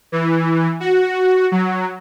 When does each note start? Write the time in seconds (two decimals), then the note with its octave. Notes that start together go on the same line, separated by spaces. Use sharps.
0.12 E3
0.80 F#4
1.52 F#3